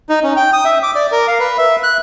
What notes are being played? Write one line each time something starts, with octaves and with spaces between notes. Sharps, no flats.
D#4
C#4
G5
D#6
E5
D6
D5
A#4
F5
B4
E5
F#6